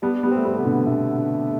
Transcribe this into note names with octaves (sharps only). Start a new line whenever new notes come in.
G3 B3 D4
G3 B3
C4
A3
G3 B3
C3 B3
B2 D3
B2 D3 A3